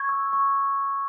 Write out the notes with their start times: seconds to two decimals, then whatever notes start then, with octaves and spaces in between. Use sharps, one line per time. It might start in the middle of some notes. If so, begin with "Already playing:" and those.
Already playing: C#6 G#6
0.09 E6
0.33 C#6